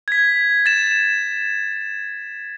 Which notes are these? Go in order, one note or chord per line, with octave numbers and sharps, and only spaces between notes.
G#6 B6
A6 E7